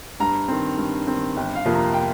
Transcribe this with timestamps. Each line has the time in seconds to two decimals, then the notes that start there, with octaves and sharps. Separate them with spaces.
0.20 G2 A#5
0.48 D#3 C4
0.78 G2
1.07 D#3 C4
1.36 G1 G5
1.55 F5
1.65 F2 C3 F3 A#3
1.75 A#5
1.94 G5